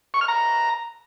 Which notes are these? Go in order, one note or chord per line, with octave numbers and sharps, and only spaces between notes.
C#6
F6
A#5